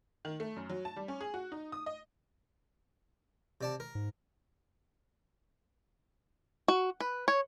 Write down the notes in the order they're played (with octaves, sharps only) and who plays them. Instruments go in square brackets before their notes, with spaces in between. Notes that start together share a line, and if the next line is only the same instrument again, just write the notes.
[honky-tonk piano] D#3
A3
F#2
F#3
A5
G3
C#4
G#4
F#4
D#4
D#6
D#5
[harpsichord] C3 D5 A5
A#4
[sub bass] G#2
[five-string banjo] F#4
B4
C#5